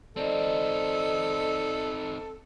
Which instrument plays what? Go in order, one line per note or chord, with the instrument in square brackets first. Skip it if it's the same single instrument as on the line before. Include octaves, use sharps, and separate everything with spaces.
[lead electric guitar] C4 D#4 [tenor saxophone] A4 [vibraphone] D5 D#5